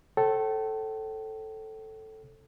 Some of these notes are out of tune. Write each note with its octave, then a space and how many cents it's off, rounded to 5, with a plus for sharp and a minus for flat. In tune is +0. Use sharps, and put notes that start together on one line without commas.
A4 +0 C#5 -45 G5 -40